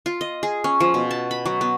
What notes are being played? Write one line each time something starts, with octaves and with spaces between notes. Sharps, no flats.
F4
D#5
G#4
C#4
F3
B2
A5
B5
F#3
B3